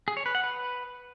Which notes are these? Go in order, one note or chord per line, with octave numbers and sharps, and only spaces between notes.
G#4
C#5
B4
F#5
B4